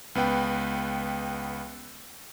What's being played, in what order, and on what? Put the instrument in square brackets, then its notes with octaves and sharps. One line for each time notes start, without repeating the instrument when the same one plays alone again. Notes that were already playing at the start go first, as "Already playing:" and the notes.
[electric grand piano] C#2 B3 B4 G5